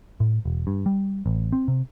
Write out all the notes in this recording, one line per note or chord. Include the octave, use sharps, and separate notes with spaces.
A2
E1
G2
G3
A1
C4
C3